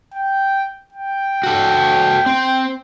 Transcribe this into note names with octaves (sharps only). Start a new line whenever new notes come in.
G5
G5
F#4 A4
C4